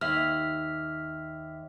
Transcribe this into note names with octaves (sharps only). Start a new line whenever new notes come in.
D#2 E5 F6